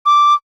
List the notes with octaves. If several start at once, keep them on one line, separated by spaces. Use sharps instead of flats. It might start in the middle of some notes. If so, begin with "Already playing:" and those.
D6